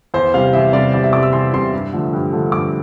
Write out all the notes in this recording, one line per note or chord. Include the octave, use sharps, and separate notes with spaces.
E2 C5
C3 G3 F5
E2 E5
C3 G3 D5
E2 D5
E5
C3 G3 D6
E6
E2 C6
C3 G3 C6
G2
D3 F3 A3
G2
D3 F3 A3
G2 D6